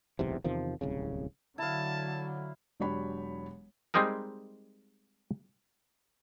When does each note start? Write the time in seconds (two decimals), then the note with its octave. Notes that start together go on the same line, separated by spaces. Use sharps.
0.19 D1 B1 E2 C3
0.44 E2 C3 D#3 F3
0.81 D1 C2 C#3
1.58 D3 F#3 E4 F5 A5
2.80 E1 F#3 D4 G4 C#5 B5
3.94 G3 G#3 C4 D#4 G#4 A#4